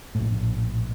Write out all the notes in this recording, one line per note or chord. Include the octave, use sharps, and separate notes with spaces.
A#1 A2